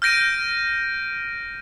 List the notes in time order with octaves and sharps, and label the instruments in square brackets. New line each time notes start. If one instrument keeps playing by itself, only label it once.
[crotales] F6 G6 A#6 D7 D#7